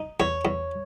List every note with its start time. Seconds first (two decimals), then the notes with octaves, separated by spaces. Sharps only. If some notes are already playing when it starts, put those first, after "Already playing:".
Already playing: D#4
0.20 E2 C#5
0.45 E2